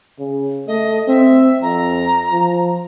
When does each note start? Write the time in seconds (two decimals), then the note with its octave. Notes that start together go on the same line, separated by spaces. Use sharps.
0.19 C#3
0.68 A3 D#5
1.08 C4 E5
1.62 F2 A#5
2.32 F3